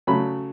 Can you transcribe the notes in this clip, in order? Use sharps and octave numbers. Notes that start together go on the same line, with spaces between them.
C#3 F#3 A3 B5